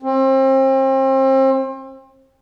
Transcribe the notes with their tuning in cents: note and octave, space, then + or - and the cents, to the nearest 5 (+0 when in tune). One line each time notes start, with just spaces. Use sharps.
C4 +35